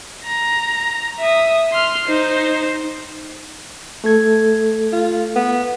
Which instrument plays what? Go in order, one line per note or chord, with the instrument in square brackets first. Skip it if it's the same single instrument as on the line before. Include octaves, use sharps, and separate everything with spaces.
[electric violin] A#5
E5 D#6
C6 F6
D#4 C5
[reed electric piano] A3 A4 G#6
[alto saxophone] F4
B3